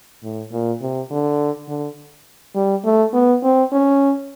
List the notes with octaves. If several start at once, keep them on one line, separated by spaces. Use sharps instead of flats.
A2
A#2
C3
D3
D3
G3
A3
B3
C4
C#4